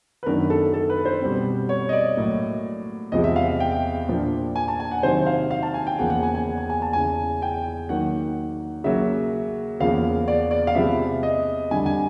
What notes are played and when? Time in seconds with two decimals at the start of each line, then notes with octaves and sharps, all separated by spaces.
0.23 B4
0.26 F#2 D#3 F#3 B3 D4 A#4
0.50 A4
0.74 A4
0.90 B4
1.05 C5
1.21 B2 G3 C4
1.69 C#5
1.89 D#5
1.93 D5
2.17 A2 F#3 A#3
3.12 E2 C3 F3 G#3 D#5
3.24 E5
3.36 F5
3.60 G5
4.08 A#2 F3 A#3 D4
4.56 G#5
4.68 A5
4.80 G#5
4.91 F#5
5.03 C3 D#3 F#3 C5
5.26 F5
5.51 F5
5.63 A5
5.74 G#5
5.87 G5
5.99 E2 C#3 F3 A#3 F#5
6.10 F#5
6.23 G#5
6.35 G#5
6.58 G#5
6.70 G#5
6.82 A5
6.93 E2 C#3 E3 G#5
7.42 G5
7.89 D#3 F#3 A#3 F#5
8.84 C#3 F#3 A#3 E5
9.80 E2 C#3 F3 A#3 F5
10.28 D5
10.51 D5
10.67 F5
10.75 C3 F3 G#3 B3 E5
11.23 D#5
11.71 F2 D3 G3 G#5
11.86 G#5